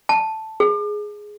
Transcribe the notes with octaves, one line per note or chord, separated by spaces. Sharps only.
A5
G#4